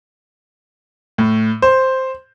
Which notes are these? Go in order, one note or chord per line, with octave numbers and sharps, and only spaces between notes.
A2
C5